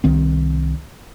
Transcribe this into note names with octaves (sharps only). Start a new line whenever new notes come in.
C2 D#3 C4